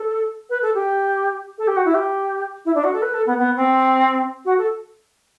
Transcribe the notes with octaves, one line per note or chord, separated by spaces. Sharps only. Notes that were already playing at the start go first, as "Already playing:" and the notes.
Already playing: A4
B4
A4
G4
A4
G4
F#4
E4
G4
E4
D4
F#4
A4
B4
A4
B3
B3
C4
F#4
A4